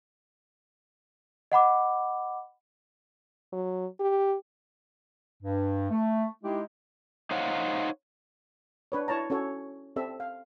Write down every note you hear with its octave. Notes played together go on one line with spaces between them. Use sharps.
D#5 F#5 B5 D6
F#3
G4
G2
A3
G#3 D#4 E4 G4
D#4 C5 C#5 F5 F#5
D4 B4 C#5
E4 C#5 A5 A#5
C#4 F#4 A4 C#5
C4 G4 A4 E5
F5